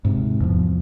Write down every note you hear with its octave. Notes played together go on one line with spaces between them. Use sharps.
G#2 C3
E2 F3